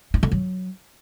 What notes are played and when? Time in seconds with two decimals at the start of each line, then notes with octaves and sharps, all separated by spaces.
0.14 D#4
0.23 D3
0.32 F#3